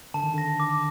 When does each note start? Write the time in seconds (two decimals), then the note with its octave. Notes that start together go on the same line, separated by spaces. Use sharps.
0.14 D3 A5
0.23 D#3
0.33 D3 A#6
0.60 D6